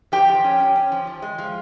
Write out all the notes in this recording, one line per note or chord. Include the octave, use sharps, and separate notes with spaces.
F3 G4 G5
F3
C#4
C#4
C#4
F3
F3
G#3
F3